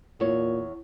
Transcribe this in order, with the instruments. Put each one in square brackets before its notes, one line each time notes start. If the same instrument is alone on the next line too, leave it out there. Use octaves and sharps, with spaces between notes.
[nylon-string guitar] E2 C#5 [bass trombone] A#2